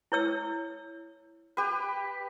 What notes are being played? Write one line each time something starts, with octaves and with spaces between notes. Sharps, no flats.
E4 C#5 E6
G4 B4